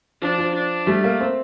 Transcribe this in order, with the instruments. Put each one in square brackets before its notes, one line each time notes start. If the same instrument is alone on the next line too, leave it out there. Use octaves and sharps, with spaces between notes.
[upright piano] F3 [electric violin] D4
[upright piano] F3
[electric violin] D4
[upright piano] G3 [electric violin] A3
[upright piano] A#3
C4